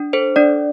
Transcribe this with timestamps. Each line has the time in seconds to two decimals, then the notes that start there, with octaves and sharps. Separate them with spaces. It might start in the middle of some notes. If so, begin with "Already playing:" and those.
Already playing: D4
0.13 A4 C5
0.36 D4 D5